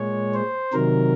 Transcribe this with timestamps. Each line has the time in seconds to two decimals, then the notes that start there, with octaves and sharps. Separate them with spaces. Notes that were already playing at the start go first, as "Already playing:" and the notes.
Already playing: A#2 G#3 C#5
0.34 C5
0.73 C3 D#3 F#3 A#4